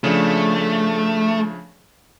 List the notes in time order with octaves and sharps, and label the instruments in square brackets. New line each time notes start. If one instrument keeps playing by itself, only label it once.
[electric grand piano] C#3 F3 D4 [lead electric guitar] A3